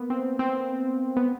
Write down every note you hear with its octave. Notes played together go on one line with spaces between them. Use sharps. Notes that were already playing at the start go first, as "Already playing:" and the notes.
Already playing: A#3 B3
C4
C4
B3